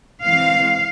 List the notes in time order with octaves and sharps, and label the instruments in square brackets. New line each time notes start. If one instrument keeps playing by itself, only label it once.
[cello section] E3 G#3 C4 F5